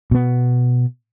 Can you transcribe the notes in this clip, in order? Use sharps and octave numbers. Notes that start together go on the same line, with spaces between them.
B2 B3